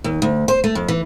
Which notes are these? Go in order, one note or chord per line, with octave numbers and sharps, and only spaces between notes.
D#2
D2
C5
A3
F2
E3